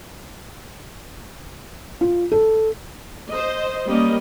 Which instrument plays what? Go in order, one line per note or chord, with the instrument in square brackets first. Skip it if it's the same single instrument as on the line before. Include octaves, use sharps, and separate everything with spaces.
[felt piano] F4
A4
[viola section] C5 D#5
G3 A#3 C#4 D#5